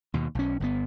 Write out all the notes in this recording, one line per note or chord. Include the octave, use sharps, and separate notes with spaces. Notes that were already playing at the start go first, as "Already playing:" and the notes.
D#2 B2
B1 C#4
G1 D3 B3